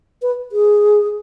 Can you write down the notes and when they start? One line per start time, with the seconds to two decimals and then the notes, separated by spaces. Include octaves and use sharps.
0.22 B4
0.52 G#4